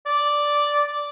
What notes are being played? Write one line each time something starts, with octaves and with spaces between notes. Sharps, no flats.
D5